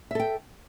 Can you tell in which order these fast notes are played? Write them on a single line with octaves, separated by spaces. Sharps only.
E5 A4 G5